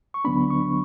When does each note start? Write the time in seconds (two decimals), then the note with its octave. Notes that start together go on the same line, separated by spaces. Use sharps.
0.14 C#6
0.25 D2 D3 F#3 B3 D4 B5
0.50 C#6